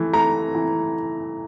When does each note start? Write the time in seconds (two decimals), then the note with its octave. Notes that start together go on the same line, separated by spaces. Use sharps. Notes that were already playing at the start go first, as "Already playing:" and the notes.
Already playing: E3 A3
0.13 A3 A#5
0.55 E3